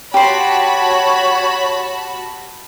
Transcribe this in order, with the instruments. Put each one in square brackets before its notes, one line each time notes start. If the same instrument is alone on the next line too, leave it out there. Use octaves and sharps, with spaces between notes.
[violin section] F#4 A5 B5 [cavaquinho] G4 C6 [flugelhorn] C#5